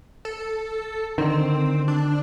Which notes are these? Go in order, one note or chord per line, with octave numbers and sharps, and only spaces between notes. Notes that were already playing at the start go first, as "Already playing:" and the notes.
A4
D3 D#3 C4
D4